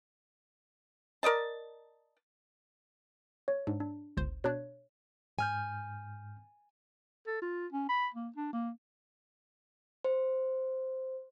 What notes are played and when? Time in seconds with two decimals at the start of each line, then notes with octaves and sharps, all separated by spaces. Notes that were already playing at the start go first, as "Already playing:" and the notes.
1.23 A#4 D5 D#5 A5
3.48 C#5
3.67 G#2 D4
3.80 D4
4.17 G1 C#2 C5
4.44 B2 D4 C#5 F#6
5.39 G#2 G#5 F6 G6
7.27 A4
7.42 F4
7.73 C#4
7.89 B5
8.14 A#3
8.36 D4
8.53 A#3
10.05 C5